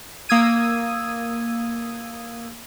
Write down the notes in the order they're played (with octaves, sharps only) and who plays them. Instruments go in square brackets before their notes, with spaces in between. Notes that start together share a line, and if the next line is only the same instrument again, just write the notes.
[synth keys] A#3 D#6 E6 G#6 D#7